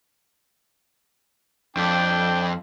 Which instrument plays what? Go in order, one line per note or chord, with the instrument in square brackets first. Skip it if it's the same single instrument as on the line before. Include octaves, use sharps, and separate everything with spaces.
[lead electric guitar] F2 [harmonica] D4 G5